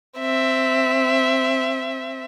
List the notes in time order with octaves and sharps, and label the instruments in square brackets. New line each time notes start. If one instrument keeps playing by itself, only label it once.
[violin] C4 E5